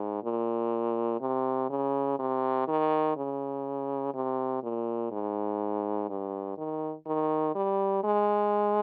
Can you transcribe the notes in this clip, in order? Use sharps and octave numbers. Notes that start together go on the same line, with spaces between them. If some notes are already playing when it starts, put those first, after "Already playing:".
Already playing: G#2
A#2
C3
C#3
C3
D#3
C#3
C3
A#2
G#2
G2
D#3
D#3
G3
G#3